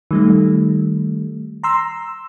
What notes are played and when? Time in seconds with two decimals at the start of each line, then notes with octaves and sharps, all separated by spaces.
0.11 D#3 G3 A3
1.64 A#5 C6 E6